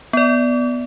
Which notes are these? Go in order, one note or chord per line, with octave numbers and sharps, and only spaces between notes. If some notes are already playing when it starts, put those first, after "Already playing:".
B3 D5